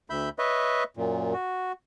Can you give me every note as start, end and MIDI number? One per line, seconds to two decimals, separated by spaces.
0.10 0.29 38
0.10 0.29 76
0.10 0.29 83
0.10 0.29 91
0.39 0.84 71
0.39 0.84 73
0.39 0.84 75
0.39 0.84 76
0.97 1.33 42
0.97 1.33 46
1.34 1.72 66